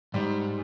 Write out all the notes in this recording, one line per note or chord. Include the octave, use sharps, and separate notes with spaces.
G#2 G3